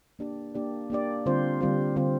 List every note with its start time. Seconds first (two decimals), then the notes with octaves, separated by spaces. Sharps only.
0.19 A#3 D4 G4 D5
0.55 A#3 D4 G4 D5
0.90 A#3 D4 G4 D5
1.26 D3 G3 C4 F4 C5
1.61 D3 G3 C4 F4 C5
1.96 D3 G3 C4 F4 C5